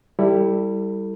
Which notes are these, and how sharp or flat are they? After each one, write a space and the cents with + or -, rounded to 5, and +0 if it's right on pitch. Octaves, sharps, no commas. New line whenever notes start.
G3 +0 E4 +0 A4 +35